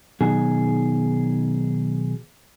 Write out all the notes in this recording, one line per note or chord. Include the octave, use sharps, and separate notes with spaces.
B1 B2 D#3 F#3 G#4